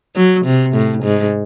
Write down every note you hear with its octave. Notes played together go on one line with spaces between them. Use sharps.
F#3
C3
A2
G#2